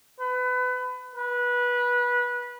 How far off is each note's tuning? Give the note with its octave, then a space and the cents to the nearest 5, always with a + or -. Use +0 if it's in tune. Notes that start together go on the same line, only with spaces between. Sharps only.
B4 +30
B4 -20